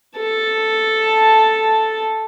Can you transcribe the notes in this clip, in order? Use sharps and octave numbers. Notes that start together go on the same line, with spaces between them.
A4 A5